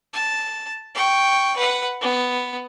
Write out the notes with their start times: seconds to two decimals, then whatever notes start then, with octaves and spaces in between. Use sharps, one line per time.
0.13 A5
0.95 G5 C#6
1.57 B4 F#5
2.01 B3